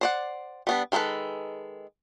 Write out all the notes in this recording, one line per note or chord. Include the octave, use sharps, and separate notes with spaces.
C5 D5 F#5
G3 B3 D4
D#3 G#3 E4 A4 B4